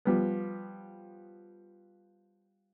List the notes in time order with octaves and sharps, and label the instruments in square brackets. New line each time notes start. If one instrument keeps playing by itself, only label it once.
[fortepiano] F3 G3 B3